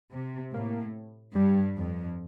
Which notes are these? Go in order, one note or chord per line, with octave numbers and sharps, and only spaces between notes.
C3
A2 A#3
G2 G3
F2